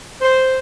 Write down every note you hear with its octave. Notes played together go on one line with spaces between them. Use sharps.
C5